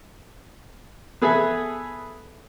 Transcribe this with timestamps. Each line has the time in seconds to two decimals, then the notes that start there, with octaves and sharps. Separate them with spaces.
1.22 B3 G#4 A4 B4 E5